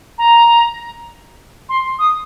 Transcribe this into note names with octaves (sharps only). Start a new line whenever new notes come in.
A#5
C6
D#6